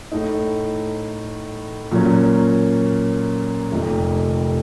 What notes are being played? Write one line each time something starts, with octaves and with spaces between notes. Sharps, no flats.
A2 A3 D#4
A#2 F#3 A#3 C#4
F1 F2 C3 D#3